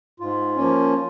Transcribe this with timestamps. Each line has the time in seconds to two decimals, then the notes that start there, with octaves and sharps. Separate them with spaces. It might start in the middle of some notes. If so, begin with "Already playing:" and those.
0.20 G#2 F4
0.57 F3 A#3 C#4